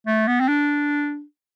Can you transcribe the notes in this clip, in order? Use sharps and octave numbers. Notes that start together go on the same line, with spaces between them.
A3
B3
C4
D4